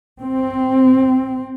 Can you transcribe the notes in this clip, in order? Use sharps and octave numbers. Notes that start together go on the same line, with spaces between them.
C4